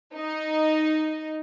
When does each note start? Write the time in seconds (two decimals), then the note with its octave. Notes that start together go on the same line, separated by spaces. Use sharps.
0.14 D#4